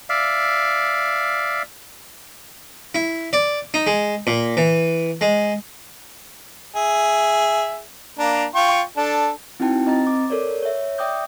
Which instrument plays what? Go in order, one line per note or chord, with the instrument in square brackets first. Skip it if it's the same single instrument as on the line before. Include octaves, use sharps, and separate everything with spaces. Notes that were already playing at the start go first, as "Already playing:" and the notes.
[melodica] D5 E5 F5
[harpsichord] E4
D5
D#4
G#3
A#2
E3
G#3
[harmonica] G#4 E5
A#3 D4 A#5
F4 G5 C#6
D4 A4
[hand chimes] C4 D#4 E4 F#4 G5 A5
C4 D#5 A#5 A6
D6
A4 A#4 C#5 D5
C#5 E5
D5 E5 G5 D6 D#6 G6